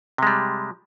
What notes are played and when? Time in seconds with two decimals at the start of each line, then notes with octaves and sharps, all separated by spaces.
0.18 C3
0.23 G#3
0.27 G3